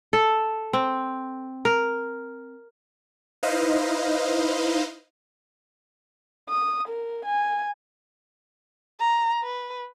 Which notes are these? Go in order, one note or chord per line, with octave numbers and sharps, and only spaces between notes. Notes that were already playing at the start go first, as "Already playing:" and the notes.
A4
C4
A#4
D#4 E4 B4 C5 D#5 F5
D#6
A#4
G#5
A#5
B4